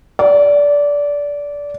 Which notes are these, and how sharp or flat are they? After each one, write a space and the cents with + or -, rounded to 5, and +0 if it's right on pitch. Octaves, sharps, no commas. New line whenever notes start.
D5 -20